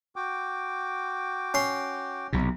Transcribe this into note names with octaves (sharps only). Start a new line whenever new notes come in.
F#4 G5 D6
C#4 C6
B1 C3